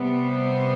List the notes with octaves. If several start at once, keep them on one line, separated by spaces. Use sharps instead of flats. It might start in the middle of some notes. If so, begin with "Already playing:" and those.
Already playing: C3 G3 B3
C5